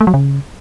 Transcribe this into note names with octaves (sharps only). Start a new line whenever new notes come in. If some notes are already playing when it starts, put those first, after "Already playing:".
A3
F#3
C#3